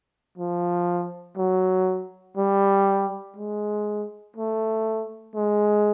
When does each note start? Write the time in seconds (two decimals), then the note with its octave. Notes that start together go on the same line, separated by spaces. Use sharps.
0.38 F3
1.37 F#3
2.37 G3
3.37 G#3
4.36 A3
5.35 G#3